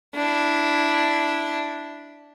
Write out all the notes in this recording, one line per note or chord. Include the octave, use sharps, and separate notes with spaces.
D4 E4